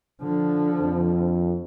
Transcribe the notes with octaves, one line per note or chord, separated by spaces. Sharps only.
D3 F3
F2